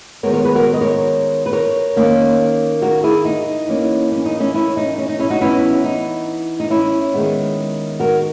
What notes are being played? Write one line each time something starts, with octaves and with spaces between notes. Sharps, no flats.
D#3 G#3 B3 A#4 C#5
A#4 C#5
G#4 B4
F#4 A#4
C#5
D#5
A#4 C#5
B4
A#4 C#5
D#3 A#3 C#4
F#4 A#4
E4 G#4
D#4
E3 A#3 C#4
C#4
D#4
C#4 E4
C#4 E4
D#4
C#4
D#4
C#4 E4
D#4 F#4
E3 B3 C#4 E4
D#4
D#4
C#4 E4
D#3 G#3 B3
F#4 A#4